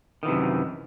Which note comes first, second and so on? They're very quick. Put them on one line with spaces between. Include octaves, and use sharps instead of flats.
D#3 E3 C3 F#2